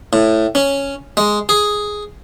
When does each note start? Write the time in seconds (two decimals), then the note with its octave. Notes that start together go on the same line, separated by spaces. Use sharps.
0.13 A2
0.55 C#4
1.17 G#3
1.49 G#4